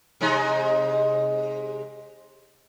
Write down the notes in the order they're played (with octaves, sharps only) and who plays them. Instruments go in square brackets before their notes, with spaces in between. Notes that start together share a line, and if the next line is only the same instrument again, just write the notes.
[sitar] C3 G#3 D#4